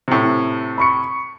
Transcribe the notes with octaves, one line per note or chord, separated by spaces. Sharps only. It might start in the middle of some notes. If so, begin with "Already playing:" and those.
A2 C3
B5 C#6 C#7